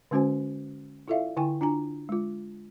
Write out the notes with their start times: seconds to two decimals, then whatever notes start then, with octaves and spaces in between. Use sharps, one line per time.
0.11 D3 G#3 C#4 F#4 C5 G#5
1.08 E4 F4 A4 D5 E5 F5
1.37 D3 E4 G5 G#5 C#6
1.61 D4 F4 G#5 A#5
2.09 G#3 F4